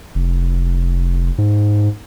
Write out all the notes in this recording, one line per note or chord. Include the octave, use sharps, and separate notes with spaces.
F1
G#2